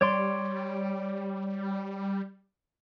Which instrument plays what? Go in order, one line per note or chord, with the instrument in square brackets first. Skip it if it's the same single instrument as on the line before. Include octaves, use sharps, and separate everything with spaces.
[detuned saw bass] G3 [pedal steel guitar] C#5 D5 C6